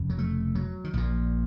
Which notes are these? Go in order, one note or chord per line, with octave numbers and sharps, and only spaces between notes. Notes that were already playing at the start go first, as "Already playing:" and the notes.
Already playing: F1 F2 C#3
F#3
A3
F#3
D#3
A#1 A#2 F3